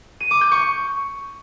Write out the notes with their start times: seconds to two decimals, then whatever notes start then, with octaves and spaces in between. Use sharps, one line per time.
0.20 D#7
0.31 D6
0.41 G6
0.52 C#6